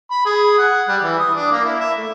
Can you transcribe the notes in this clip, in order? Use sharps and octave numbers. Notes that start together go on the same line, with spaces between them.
B5
G#4
F#5
G3
E3
D#6
D4
A#3
E4
E5
A3